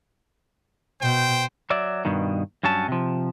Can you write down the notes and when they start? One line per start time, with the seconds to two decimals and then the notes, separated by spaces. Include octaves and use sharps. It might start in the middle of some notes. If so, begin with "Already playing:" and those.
1.02 B2 C5 G5
1.70 F#3 D5 E5
2.05 G2 B2 D#3
2.63 G2 F#3 C#4 A5
2.88 C3 F3